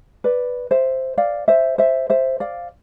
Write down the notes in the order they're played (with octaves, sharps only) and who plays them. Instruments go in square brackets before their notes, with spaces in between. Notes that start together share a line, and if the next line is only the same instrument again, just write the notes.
[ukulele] B4 D5
C5 E5
D5 F5
C5 E5
C5 E5
C5 E5
D5 F5